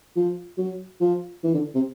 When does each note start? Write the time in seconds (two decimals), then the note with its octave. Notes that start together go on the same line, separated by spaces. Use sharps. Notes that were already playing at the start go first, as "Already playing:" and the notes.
0.16 F3
0.58 F#3
1.01 F3
1.44 E3
1.54 D3
1.74 C3